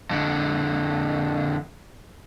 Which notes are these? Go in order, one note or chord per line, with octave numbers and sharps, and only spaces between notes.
F2 D3